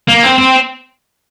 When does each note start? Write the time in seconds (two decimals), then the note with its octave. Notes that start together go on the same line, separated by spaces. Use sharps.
0.08 A#3
0.24 C4
0.39 C4